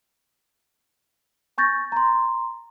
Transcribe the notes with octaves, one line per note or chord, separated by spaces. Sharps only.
G#5 C#6 G6 A6 A#6
A#5 C6